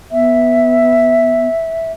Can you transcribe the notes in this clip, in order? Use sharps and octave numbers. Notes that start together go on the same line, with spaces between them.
B3 E5